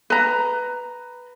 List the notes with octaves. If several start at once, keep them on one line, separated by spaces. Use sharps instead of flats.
B4 A#5